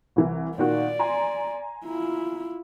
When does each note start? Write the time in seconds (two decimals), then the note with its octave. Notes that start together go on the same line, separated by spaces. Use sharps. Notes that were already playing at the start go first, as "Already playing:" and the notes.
0.16 C2 E3
0.58 A#2 D#3 F#4 D5
0.99 G#5 A#5 C6
1.86 E4 F4